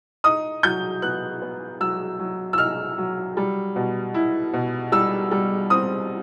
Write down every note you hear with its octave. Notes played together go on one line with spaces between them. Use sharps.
D#4 D#6
F#3 G6
B3 F#6
B3
F#3 E6
F#3
E6
D#4 F6
F#3
G3
B2
E4
B2
G3 E6
G3
C4 D#6